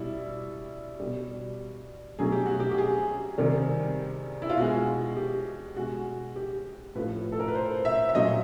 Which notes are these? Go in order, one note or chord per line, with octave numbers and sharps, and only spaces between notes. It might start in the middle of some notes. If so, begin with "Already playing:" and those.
Already playing: B2 G3 E4
B2 G3
B2 F#3 A3 G#4
G4
F#4
G4
G4
G#4
C3 D#3 G3
E4
F4
B2 G#3 F#4
G4
B2 G#3 F#4
G4
A2 F3 A3 B4
A4
A#4
B4
C5
E5
E5
A#2 F#3 A3 D#5